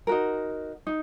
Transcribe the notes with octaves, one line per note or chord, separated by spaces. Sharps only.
D#4 F#4 A#4
D#4